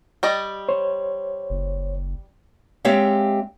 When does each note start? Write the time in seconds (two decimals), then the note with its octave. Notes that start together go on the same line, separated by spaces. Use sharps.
0.23 G3 D5 D#5
0.69 C5 C#5
1.50 F#1
2.85 G#3 C4 G4 C#5 E5 F5